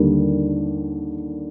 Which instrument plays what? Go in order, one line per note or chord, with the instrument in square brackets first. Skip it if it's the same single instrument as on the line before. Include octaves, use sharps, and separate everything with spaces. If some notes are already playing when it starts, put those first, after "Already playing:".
Already playing: [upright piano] D#2 D3 G3 A#3